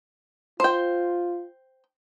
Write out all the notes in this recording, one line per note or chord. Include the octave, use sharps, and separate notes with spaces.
F4 C5 G5